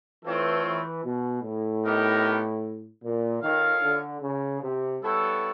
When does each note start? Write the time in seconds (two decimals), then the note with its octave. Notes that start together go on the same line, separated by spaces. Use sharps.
0.24 E3 A3 C4 F4 A4 C#5
0.64 E3
1.04 B2
1.43 A2
1.84 B3 D#4 G4 A#4 D#5
3.03 A#2
3.42 D#3 F4 A4 C#5 F5
3.83 D3
4.22 C#3
4.62 C3
5.01 G3 B3 E4 A4 C#5